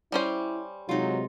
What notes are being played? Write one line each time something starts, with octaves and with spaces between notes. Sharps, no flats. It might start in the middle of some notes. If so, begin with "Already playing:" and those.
G3 C#4 E4 C5
C3 F#3 G#3 D#4 F4